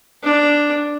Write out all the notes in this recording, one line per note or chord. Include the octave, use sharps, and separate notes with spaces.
D4